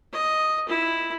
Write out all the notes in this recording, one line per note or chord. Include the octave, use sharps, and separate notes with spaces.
D#5
E4